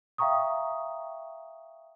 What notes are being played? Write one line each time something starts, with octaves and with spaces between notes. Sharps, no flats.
E5 F5 G5 A#5 C#6 D#6